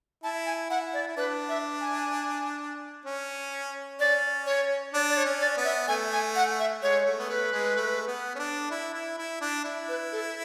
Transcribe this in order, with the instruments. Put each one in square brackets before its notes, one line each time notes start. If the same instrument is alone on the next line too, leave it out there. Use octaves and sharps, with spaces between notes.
[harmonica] E4 [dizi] A5
[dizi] G#5
[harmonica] E4 [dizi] F#5
[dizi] D5
[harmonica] E4
[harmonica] D4 [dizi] B4
[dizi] E5
G#5
[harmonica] C#4
[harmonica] C#4 [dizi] D5
[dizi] C#5
[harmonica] D4 [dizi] D5
[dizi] D5
C#5
[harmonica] C#4
[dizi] D5
[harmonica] B3
[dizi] E5
[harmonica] A3 [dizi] G#5
[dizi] G#5
F#5
E5
[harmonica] G#3 [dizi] C#5
[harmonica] A3
B3
[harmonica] A3 [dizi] B4
[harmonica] G#3
A3
B3
C#4
D4
E4
E4
E4
D4
E4
[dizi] B4
A4